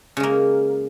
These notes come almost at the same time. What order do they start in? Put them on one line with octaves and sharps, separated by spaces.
C#3 G#3 A#3